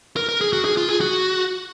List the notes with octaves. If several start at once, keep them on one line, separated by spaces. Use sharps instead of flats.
A#4
A#4
G#4
F#4
G#4
F4
G#4
F#4